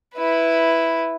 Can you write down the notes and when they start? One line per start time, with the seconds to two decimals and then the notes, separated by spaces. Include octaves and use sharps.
0.15 E4 B4